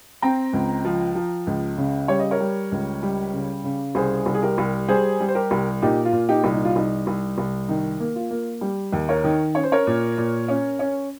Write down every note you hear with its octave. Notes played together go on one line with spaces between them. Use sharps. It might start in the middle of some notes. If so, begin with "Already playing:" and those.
C4 G5 A#5
C#2
F3
F3
C#2
C#3
G3 C#5
D#5
A#4 C#5
G3
C#2
G3
C#3
C#3
C2 G#4 C5
C2
G#4
G4 A#4
C2
G3 G#4 C5
G3
C5
G4 A#4
C2
A#2 D#4 G4
F4
A#2
D#4 G4
C2
D#4
F4
C2 D#4
C2
C2
D#3 D#4
A#3
F4
A#3
G3
D#2
A#4 C#5
D#3
C#4 C#5
C5
A#4 C#5
A#2
A#2
C#4
C#4